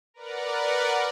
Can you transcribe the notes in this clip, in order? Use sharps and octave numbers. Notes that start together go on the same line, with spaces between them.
A#4 B4 D5 F#5